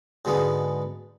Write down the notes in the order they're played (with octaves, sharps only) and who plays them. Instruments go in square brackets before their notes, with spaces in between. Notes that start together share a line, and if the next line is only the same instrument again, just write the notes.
[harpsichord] G#2 B2 D3 G#3 B3